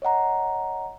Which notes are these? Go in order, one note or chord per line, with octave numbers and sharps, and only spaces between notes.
C#5 D#5 F#5 A#5